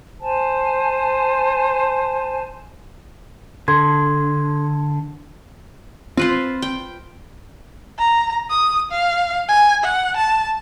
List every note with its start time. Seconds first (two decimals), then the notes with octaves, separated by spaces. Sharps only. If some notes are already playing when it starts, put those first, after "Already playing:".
0.20 C5 G#5 A5
3.68 D3 A4 C6 G#6
6.17 C4 F4 B4 C5
6.62 G5
7.98 A#5
8.50 D#6
8.91 F5
9.48 G#5
9.83 F#5
10.17 A5